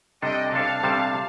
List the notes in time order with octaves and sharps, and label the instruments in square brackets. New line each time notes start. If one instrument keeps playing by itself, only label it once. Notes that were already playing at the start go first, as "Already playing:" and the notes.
[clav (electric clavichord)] C3 G3 D4 A4 [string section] D#5 G5
[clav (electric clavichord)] C3 G3 D4 A4 C5 [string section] F5 A5
[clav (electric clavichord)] C3 G3 D4 A4 C5